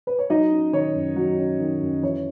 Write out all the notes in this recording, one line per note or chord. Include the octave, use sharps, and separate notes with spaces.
B4
C#5
F#3 D#4 D#5
C#4
D#3 C#5
F#2
F#3
C#4
D#3
F#2
E3 C#5